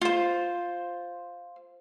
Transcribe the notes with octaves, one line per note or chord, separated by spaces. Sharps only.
F4 C5